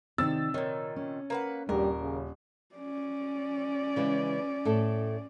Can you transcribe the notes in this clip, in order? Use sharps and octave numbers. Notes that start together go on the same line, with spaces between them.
C3 D#3 C5 D5 E6 A6
A#2 D#3 C#5
C#4
A#3 B4 F#5
D#1 G2 G3 G4 A#4
C#3
C#4 D5
C#3 E3 G#3
A2 A4